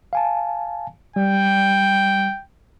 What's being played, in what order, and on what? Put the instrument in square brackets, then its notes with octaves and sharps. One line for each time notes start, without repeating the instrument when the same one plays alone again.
[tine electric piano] F5 G#5 A5
[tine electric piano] G3 [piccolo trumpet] G5